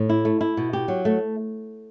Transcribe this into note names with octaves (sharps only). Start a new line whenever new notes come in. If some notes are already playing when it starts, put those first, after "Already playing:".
Already playing: A2
E4
A3
E4
B2
G4
F#3
A3